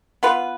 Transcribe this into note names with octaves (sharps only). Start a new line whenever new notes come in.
B3 F4 B4